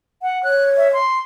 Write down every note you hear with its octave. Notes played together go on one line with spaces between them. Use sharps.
F#5
C#5 F#6
E5
C6